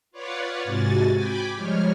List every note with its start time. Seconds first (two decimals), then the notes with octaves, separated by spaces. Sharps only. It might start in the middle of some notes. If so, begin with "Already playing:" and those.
0.11 F4 B4 C#5 D5 F5 F#5
0.64 G#2 C3 F#4 G#5 A6
1.14 G5 G#5 B5 D6
1.54 F3 G3 G#3 C#5 F6